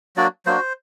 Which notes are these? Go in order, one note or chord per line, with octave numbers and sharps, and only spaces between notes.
F#3 A#3 D4 F#4 D5
F#3 A#3 D4 F#4 C5